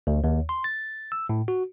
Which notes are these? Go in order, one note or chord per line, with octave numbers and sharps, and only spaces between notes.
D2
D#2
C6
A6
E6
A2
F#4